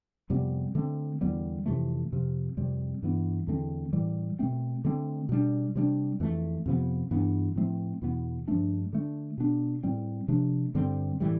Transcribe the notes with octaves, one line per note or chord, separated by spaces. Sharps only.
F2 C3 G3 B3
D3 A3 C4
E2 D3 G3 B3
F2 C3 E3 A3
F2 C3 F3
F2 C3 G3
G2 E3 B3
E2 D3 A3 C4
A2 E3 G3
B2 A3 C4
D3 A3 C4
B2 G3 D4
C3 G3 D4
F2 E3 A3
F2 C3 F3 B3
G2 E3 B3
A2 F3 A3 C4
E2 B2 B3
G2 F3 A3 D4
D3 A3 D4
B2 B3 D4
A2 G3 C4
C3 F3 A3 D4
G2 D3 G3 C4
A2 E3 G3